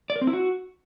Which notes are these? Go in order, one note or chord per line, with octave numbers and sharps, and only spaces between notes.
D5
A#4
C4
E4
F#4